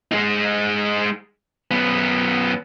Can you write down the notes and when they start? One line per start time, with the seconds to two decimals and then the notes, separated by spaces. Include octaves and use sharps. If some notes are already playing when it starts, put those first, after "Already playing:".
0.12 G#3 D#4
1.71 F#2 B3